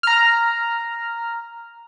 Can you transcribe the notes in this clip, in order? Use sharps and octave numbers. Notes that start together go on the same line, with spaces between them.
A#5 F6